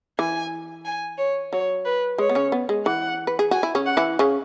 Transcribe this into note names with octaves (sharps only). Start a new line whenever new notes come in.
E3 G#5
G#5
C#5
F#3 C#5
B4
G#3 C#5
B3
C#3 C#4
B3
G#3
E3 F#5
B4
G#4
F#4 G#5
E4
C#3 C#4
F#5
E3 E4
C#3 C#4